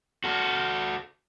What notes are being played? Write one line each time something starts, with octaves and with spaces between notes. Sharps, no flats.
F#4 A4